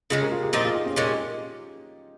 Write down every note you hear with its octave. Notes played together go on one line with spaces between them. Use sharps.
C#3 G#3 C#4 F4 G#4
G4 A#4
F4 G#4
G4 A#4
A#2 F3 C4 D#4 F4 G#4
F4 G#4
D#4 G4
C#4 F4
A#2 G#3 C#4 F4 G#4
D#4 G4